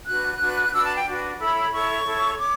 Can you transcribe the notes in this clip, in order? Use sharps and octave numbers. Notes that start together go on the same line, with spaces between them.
D4 F#4 B4 F#6
D4 F#4 B4
D4 F#4 B4 E6
A5
G5
D4 F#4 B4
E4 A4 C#5 B5
E4 A4 C#5 C#6
E4 A4 C#5
C#5 D6